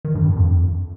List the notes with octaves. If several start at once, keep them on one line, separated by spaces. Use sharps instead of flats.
D#3
G2
G2
F2